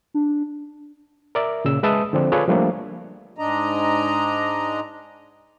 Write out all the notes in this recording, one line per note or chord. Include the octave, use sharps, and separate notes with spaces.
D4
A#4 D5 E5
A#2 C#3 E6
G#3 B4 E5 A5 D#6 E6
D3 F3 C4 D4
F4 G#4 A4 B4 C#5 D5
F3 G3 A3 A#3 D4
G#2 D4 D#5 A#5